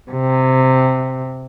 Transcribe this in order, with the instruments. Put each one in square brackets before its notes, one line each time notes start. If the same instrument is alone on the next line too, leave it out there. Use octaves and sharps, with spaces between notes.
[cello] C3